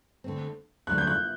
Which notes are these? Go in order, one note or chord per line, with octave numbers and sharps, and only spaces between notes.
D3 A3 C4
D2 D3 F#3 A3 F#6
G6
F#6